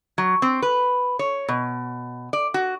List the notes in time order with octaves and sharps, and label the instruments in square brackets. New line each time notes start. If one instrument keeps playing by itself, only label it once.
[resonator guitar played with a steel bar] F#3
C4
B4
C#5
B2
D5
F#4